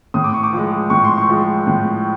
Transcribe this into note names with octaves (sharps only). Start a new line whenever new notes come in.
A2 D#6
D6
C#6
D6
F3 G#3
A2 C#6
C6
C#6
F3 G#3
A2